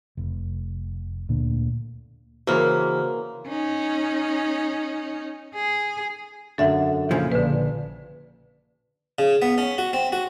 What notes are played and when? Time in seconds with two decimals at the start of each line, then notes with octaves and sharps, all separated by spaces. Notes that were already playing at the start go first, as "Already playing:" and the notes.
0.17 F1
1.29 D2 A#2 D3
2.47 C#3 E3 A#3 F#4 C5 F6
3.48 C#4 D#4
5.55 G#4
6.58 F#2 D3 A4 E5 F#5
7.11 A#2 C#3 F3
7.32 A#1 D3 B4
9.19 C#3
9.42 B3
9.58 C#4
9.78 F#4
9.93 C4
10.12 F#4